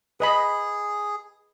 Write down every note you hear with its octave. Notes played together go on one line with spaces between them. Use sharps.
G#4 B4 D#5 B5